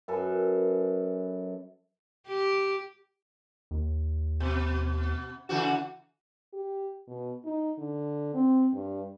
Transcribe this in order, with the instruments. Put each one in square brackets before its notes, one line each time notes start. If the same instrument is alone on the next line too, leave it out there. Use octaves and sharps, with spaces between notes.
[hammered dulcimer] F#2 A4 B4 G#5
[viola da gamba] G4
[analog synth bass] D#2
[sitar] B2
C#3 E3 F#4
[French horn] G4
B2
D#4
D3
C4
G2